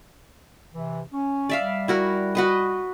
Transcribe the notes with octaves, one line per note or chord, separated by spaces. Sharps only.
C3 E3
C#4
D5 E5 F5
G3
E4 F#4 A#4
F#4 B4 D#5